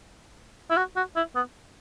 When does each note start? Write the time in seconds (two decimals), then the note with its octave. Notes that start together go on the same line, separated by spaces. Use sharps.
0.70 E4
0.77 F#4
0.96 F#4
1.16 E4
1.35 B3